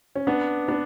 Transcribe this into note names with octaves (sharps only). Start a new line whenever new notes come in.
C#4
B3 D4
B3 D4